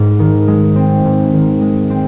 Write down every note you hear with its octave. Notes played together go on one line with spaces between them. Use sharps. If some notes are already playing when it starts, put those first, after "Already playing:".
Already playing: G#2
D#3
G#3
C4
G#2
D#3
G#3
C4